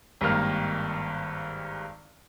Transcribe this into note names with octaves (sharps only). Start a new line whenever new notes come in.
G#1 G2 D#3 A#3 F6